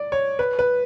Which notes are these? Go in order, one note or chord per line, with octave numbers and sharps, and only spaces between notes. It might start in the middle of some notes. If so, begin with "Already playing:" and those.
Already playing: D5
C#5
B4
B4